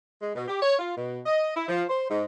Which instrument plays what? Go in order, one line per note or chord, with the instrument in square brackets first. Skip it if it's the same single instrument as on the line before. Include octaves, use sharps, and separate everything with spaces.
[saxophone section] G#3
B2
G4
C#5
F4
B2
D#5
E4
F3
C5
G#2